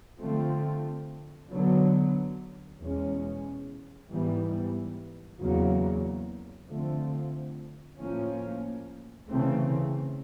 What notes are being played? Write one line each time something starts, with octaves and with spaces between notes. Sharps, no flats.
D3 F3 A3 C4
D3 F#3 B3
E2 B2 G#3 C#4
G#2 E3 G3 B3
E2 C#3 F#3 A#3
D3 F3 A3 C4
A2 F3 A#3 C#4
C#3 E3 A3 C4